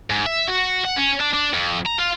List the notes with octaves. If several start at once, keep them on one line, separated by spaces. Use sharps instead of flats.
G#2
E5
F#4
F#5
C#4
D4
D4
F2
A#5
F4